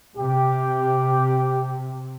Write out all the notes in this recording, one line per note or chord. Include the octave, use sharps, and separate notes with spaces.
C3 G4